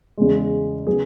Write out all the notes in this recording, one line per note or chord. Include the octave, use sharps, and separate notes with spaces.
E2 C#3 G#3
C#3 F#3 B3 G#4